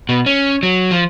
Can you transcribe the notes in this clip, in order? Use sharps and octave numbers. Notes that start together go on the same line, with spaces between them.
B2
C#4
F#3
F3